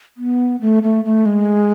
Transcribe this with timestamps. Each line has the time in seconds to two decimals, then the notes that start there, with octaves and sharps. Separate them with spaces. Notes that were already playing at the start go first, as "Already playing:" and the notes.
0.17 B3
0.61 A3
0.83 A3
1.05 A3
1.26 G#3